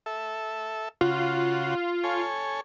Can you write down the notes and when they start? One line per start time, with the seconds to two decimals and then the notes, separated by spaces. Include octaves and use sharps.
0.06 A4 E5
1.01 C#3 F4 F#4
2.04 A4 C#5 G#5